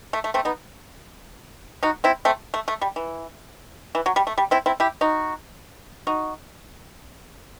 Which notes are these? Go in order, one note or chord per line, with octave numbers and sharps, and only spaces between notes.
A3
A3
A3 C4
B3 D#4
D#4 F#4
C4 E4
A3 C4
A3
A3
G3
E3
E3
F#3
G3
A3
G3
C4 E4
C4 E4
E4 G4
D#4 F#4
D#4 F#4